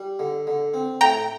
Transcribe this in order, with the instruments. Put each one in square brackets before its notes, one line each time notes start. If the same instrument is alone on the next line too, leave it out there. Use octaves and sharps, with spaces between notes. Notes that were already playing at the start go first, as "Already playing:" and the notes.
Already playing: [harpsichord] G3
D3
D3
C4
[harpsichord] A2 [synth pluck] G5 A#5